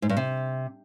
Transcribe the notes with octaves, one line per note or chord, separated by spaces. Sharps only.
G#2
G2
C3